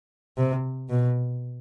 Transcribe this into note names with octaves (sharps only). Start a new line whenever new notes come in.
C3
B2